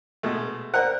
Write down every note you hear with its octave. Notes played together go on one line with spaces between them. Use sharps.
B2 G#3 A3
A#4 C5 D5 F#5